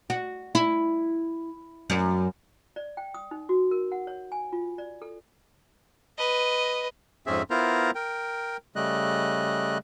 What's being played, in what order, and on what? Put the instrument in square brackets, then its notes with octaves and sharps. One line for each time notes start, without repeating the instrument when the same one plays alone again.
[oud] F#4
E4
F#2
[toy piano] D5
G5
D#6
D#4
F#4
A#4
F#5
C#5
G#5
F4
D5
A4
[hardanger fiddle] B4 D#5
[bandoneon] F2 G#2 C4 C#4 G#4 E5
B3 E4 F4 A#4 C5 A#5
A#4 G5
C#3 G3 A3 D#5 F#6